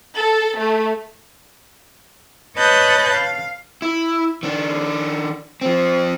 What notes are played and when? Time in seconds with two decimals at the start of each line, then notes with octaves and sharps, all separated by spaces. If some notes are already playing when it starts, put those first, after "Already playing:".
0.18 A4
0.60 A3
2.58 B4 C#5 D#5 A5 F#6 G6
3.14 F5
3.82 E4
4.43 D#3 D4
5.61 F3 C4